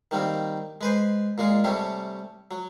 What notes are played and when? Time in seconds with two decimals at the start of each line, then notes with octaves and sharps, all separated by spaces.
0.11 D#3 G3 A#3 C4
0.81 G#3 B4 C5
1.38 A#2 G#3 F4
1.64 C3 G3 A3 C#4
2.51 F#3